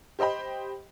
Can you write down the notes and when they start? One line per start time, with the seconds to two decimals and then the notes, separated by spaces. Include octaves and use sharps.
0.19 G4 C5 D#5 G5 B5